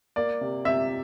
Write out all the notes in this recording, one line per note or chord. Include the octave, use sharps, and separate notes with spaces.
A#3 D5
C3
C3 E5